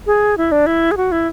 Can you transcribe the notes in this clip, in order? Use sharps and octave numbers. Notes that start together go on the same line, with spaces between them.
G#4
E4
D4
E4
G#4
F#4
E4